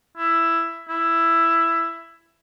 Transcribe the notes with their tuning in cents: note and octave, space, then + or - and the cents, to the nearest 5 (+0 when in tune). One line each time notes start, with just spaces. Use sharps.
E4 +10
E4 +10